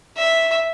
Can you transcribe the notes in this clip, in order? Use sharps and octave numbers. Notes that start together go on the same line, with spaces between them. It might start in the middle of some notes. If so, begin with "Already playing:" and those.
E5